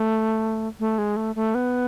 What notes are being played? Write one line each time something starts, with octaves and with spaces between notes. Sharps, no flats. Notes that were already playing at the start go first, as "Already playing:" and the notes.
Already playing: A3
A3
G#3
A3
A3
B3